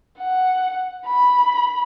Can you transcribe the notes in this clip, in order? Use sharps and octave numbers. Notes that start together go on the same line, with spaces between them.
F#5
B5